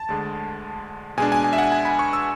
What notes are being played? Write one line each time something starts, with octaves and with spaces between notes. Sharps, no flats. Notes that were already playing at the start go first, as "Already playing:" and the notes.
Already playing: A5
D2 D3 G#3
B2 G#3 D4 G#5
G#5
G#5
E5
F#5
G#5
B5
C#6
E6